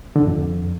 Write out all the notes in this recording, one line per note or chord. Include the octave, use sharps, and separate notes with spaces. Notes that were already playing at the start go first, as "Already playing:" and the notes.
D3
E2
F2